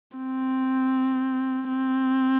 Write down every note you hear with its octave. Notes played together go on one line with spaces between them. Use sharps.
C4
C4